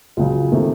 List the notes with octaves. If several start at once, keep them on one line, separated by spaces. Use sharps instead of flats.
C#2 C#3 F#3
C3 D#3 A3